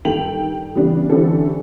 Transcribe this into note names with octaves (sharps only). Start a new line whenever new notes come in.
G2 D#3 A4 G5 F7 F#7
C#3 E3 G3 B3 D4
D3 E3 G3 C4 C#4 A4